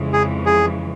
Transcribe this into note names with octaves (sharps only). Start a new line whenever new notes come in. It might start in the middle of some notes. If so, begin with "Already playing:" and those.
Already playing: F2 C#3 E3 G#3
G#4
G#4